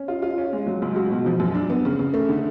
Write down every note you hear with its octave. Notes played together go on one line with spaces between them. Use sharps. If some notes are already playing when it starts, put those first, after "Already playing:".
Already playing: C#4
F4
F4
C#4
G#3
F#3
C#2
F#4
B2
F3
F#2
D4
B3
C#3
C#3
A3
D3